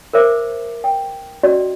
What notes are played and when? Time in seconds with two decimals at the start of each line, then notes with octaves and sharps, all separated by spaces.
0.13 A#4 C5 E5 D6
0.84 G5
1.43 C#4 F#4 D5 D#5